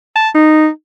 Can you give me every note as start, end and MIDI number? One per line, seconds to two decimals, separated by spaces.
0.16 0.29 81
0.35 0.69 63